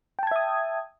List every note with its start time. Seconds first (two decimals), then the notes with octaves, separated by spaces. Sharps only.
0.19 G5
0.23 A5
0.27 G#6
0.31 E5
0.36 D#6